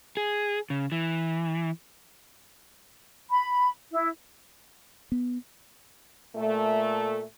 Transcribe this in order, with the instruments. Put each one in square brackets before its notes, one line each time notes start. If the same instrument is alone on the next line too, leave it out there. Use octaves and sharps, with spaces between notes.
[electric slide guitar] G#4
C#3
E3
[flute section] B5
E4
[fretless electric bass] B3
[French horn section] A#2 A3